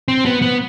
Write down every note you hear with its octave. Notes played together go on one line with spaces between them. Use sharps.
C4
B3
B3